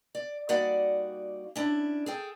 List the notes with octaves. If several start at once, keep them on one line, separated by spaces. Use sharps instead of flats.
D5
G3 A#3 D#4 F#4 D5 F#5
C#4 D4 E4
G#4 A4 G5